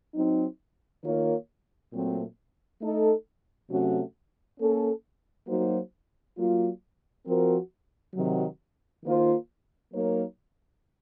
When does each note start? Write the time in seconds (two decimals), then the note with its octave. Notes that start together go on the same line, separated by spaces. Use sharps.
0.14 F#3 C4 D#4
1.02 D#3 A#3 F4 A#4 C#5
1.92 A#2 F#3 A3 C4
2.81 A3 D#4 A4
3.69 C3 F#3 A3 C#4 F#4
4.59 A#3 C#4 A4
5.47 F#3 A#3 D#4 F#4 C5
6.37 F#3 A#3 F4
7.26 F3 C4 F#4 A#4
8.14 C3 D#3 F#3
9.03 D#3 A#3 F4 C5
9.92 F#3 A#3 D#4 A#4 C#5